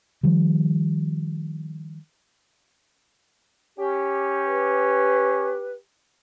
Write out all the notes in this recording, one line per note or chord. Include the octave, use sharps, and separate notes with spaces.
D#3 F3 G3
C#4 G4
B4